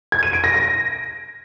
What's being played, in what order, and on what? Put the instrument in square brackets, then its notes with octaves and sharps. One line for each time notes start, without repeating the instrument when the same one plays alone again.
[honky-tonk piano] G#6
D#7
D7
A#6
A#6